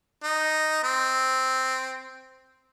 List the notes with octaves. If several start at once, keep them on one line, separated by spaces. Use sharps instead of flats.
D#4
C4